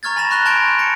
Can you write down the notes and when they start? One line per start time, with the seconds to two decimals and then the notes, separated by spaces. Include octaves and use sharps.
0.03 A#5 C#6 F6 G#6 A6
0.16 G#5 B5 A6 A#6 E7 F7
0.30 B5 C#6 F#6 A#6 F7 G7
0.45 A5 C6 C#6 G6 D7
0.79 A#6 C#7